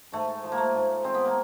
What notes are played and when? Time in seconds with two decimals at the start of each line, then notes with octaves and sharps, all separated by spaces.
0.12 G#2 A3
0.43 F3
0.52 A#3
0.58 A3
0.74 G#2
1.04 G#3 C4
1.14 B3
1.25 A#3